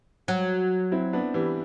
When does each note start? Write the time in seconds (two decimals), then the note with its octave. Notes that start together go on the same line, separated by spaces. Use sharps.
0.28 F#3
0.92 C4 E4
1.13 B3 D4
1.34 E3 G3